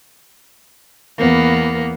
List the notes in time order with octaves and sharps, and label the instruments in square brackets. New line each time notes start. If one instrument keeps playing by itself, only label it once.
[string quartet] E2 A#3 B3